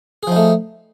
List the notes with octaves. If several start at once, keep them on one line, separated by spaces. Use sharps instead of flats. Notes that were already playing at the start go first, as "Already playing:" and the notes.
F3 A3 D#4 G#4